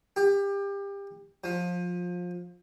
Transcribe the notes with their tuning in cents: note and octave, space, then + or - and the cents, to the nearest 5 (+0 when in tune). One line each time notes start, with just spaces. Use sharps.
G4 +25
F3 +25